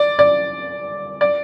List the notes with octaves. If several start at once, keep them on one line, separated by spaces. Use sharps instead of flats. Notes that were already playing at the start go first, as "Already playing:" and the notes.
Already playing: D5
D5
D5